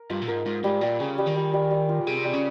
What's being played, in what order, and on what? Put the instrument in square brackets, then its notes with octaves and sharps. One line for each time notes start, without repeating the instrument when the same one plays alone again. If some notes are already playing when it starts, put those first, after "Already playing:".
Already playing: [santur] A#4
[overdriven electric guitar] G2 [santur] F4
[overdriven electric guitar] A#2
[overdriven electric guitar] G#2 [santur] A#4
[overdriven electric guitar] G#2 [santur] F4
[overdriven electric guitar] G#2 [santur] G3
[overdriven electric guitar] A#2 [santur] G3
[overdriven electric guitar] C#3 [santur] G#4
[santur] G3
[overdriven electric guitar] D#3
[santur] G3
G3
G3
F4
[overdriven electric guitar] A#2
[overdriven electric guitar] C3 [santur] G#4
[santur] G3
[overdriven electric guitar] C#3